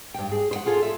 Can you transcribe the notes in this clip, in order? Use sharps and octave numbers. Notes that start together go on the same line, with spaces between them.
G2 G5
G#4
C5 F#5
F4 G#4 A4
E5